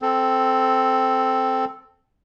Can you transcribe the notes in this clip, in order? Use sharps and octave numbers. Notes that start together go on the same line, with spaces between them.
C4 A4